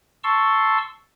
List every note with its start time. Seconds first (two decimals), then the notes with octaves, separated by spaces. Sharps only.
0.24 A5 C6 C#6 E6